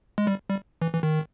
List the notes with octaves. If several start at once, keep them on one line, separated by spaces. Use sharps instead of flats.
G#3
G3
G3
E3
E3
D#3